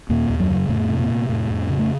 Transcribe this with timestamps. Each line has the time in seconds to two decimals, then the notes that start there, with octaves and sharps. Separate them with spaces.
0.09 D#2 A#2 A#3
0.30 D#2
0.40 F#2 F#3
0.50 C#3
0.69 F2 A2 A3
0.90 C3
0.99 A#2 A#3
1.10 C3
1.29 F2 A2 A3
1.50 F2
1.70 C#3
1.79 A3